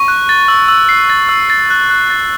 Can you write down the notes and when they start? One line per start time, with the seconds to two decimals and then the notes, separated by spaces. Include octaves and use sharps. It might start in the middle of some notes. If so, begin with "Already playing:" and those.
Already playing: C#6
0.08 F#6
0.29 A6
0.48 E6
0.68 E6
0.89 C7
1.10 A6
1.29 E6
1.50 A6
1.70 F#6
1.90 F#6
2.10 A6